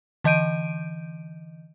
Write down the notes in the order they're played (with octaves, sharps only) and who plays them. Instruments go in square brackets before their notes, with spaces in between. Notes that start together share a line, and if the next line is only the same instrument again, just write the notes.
[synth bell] D3 E3 D#5 G6 D7 D#7